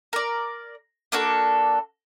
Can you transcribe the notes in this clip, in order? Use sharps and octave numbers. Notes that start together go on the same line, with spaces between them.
A#4 D5
A#3 D4 F#4 A4